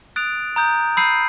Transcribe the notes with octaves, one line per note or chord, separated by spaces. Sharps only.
D#6 F#6 A6 D7 F7
A#5 D#6 G6
B5 E6 G6 C7 D#7